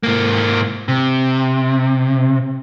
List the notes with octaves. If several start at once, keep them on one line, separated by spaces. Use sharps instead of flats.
G#2 A#3
C3